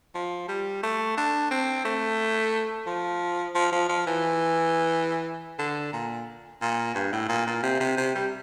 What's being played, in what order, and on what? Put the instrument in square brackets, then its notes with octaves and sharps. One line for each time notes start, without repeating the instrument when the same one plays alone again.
[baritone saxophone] F3
G3
A3
D4
C4
A3
F3
F3
F3
F3
E3
D3
A#2
A#2
G2
A2
A#2
A#2
C3
C3
C3
G3